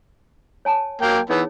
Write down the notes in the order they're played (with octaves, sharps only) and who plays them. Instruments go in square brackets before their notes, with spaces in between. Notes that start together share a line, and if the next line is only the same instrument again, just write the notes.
[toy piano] C#5 G#5 A5
[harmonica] F#3 A#3 G5
[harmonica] E3 B3 [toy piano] D#4 G#4 C#5